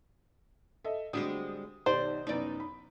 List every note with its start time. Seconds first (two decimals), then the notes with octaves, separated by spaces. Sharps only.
0.84 A4 D#5 E5
1.13 D3 G3 G#3 C4 F#4 D#6
1.86 B1 D#3 G4 C5 D5
2.27 C2 F#2 B3 D#4 D5
2.60 B5